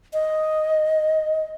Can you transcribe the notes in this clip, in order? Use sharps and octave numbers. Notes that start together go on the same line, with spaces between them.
D#5